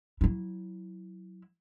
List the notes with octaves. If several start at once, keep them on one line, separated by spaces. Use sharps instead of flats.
F#3 E4